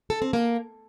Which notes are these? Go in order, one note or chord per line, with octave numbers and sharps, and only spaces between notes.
A4
C4
A#3